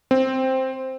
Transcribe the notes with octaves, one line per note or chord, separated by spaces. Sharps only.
C4